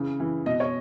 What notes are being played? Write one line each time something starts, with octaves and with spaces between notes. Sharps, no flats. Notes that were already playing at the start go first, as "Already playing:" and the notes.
Already playing: C#3 E3
E3
B2 D#5
C#5